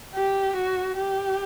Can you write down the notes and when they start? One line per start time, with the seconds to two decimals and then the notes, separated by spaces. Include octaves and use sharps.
0.15 G4
0.56 F#4
0.97 G4